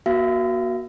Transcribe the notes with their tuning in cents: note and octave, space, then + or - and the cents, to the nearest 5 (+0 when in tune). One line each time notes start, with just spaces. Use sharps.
A#3 +40 F#4 +0 F5 -45